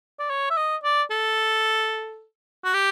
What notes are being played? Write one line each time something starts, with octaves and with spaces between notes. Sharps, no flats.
D5
C#5
E5
D#5
D5
A4
F#4
G4